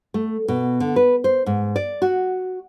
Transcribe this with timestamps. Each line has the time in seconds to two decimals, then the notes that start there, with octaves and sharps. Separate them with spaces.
0.14 A3
0.48 B2
0.80 D3
0.96 B4
1.24 C5
1.46 G#2
1.76 D5
2.02 F#4